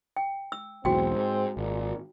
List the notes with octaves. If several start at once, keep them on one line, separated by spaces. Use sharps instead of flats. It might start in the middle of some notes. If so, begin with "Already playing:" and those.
G5
E6
B1 E2 G#2 C4 F#4 G5
G#2
G#1 A#2